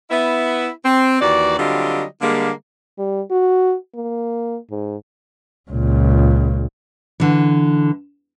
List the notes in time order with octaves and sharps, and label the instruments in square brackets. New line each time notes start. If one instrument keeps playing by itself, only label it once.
[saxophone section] B3 E4 E5
C4
D#2 E3 F#4 D5
D3 F#3 G3 C4 F4 D#5
D3 G3 G#3 A#3
[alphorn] G3
F#4
A#3
G#2
[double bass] C#2 A#2
[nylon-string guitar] D3 E3